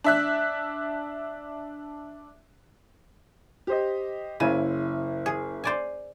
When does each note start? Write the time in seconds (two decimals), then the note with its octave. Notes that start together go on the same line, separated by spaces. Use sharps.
0.04 D4 E5 F#6
3.67 G4 C5 D#5
4.40 F#1 C#3 E4 D#7
5.26 G#4
5.64 C5 D5 G#5